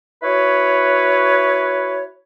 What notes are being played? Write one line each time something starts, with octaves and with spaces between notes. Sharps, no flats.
E4 F#4 B4 C#5